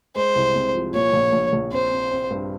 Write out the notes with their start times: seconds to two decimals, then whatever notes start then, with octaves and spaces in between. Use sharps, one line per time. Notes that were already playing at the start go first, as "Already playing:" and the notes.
0.16 G#3 C5
0.35 C2
0.55 C3
0.74 F3
0.94 A#2 C#5
1.13 A#1
1.32 A#1
1.53 A#1
1.72 C4 C5
1.91 C4
2.11 C4
2.30 G2